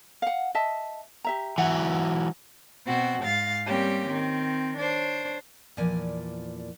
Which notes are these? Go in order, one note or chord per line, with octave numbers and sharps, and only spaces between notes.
F5 F#5
D#5 E5 A5
G4 E5 A#5
E3 F#3 F#5
B2 C4 F#4
G#2 F5 A6
G3 A#3 C4 C#4 G4
D#3 C4
D4 C5 C#5
E2 A#2 F3 A#4 D5 G#5